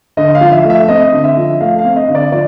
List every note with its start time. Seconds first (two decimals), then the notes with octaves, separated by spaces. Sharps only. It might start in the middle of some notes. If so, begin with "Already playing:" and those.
0.17 D3 D#5
0.35 F5
0.41 F3
0.52 E5
0.65 A3
0.70 E5
0.88 C4 D#5
1.12 D3
1.24 E5
1.37 F3
1.60 A3 F5
1.79 F5
1.84 C4
1.96 D#5
2.08 D3
2.15 D5
2.32 F3 D5